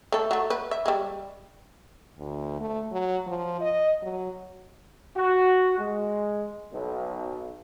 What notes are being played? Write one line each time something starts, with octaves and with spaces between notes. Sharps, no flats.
A3 A4
F#3 A3
B4
E5
G3 G#3
D2
A3
F#3
F3
D#5
F#3
F#4
G#3
B1